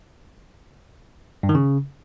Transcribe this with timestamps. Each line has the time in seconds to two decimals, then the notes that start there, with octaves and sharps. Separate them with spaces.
1.43 G2
1.49 D#3
1.55 C#3